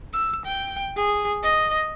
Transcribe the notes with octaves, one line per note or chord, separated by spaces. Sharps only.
E6
G5
G#4
D#5